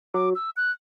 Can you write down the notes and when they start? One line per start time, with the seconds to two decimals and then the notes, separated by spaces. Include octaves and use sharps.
0.14 F#3 D6
0.35 E6
0.57 F#6